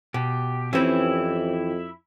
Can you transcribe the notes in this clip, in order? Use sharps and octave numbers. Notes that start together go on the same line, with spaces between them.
B2 G4
F2 E3 C4 C#4 E4 G4 E5